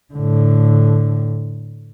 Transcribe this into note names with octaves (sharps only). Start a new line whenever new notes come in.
A2 D3